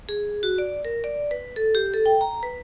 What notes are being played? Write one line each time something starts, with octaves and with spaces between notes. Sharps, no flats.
G#4
F#4
D5
A#4
D5
B4
A4
G4
A4
G5
A#5
B4